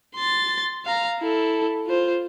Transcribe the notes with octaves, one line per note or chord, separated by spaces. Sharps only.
C6 A6
F5 A#5
E4 A4
F4 C5